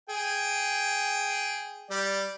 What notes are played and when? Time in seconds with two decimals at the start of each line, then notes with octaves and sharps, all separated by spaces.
0.09 G#4 G5
1.90 G3 D5